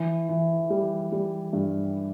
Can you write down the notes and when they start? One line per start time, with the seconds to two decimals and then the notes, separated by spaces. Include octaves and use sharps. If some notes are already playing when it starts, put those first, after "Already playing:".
Already playing: E3
0.29 E3
0.70 G3
1.12 G3
1.53 G2